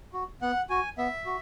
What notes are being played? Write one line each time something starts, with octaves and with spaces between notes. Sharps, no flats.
F#4
B3 F#5
F#4 G#5
B3 E5
F#4